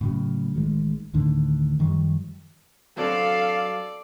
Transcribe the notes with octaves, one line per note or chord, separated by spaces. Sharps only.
A2 C#3 F#3
A1 D#3 F3 G#3
D2 A2 D3 D#3
F#2 D#3 F3 G3
F#3 C4 D4 A4 D5 F5